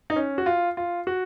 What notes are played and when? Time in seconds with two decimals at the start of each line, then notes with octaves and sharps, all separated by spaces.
0.10 D#4
0.16 C#4
0.38 F#4
0.46 F4
0.77 F4
1.07 F#4